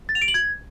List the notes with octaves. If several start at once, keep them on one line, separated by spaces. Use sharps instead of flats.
A6
F7
D7
F#7
G#6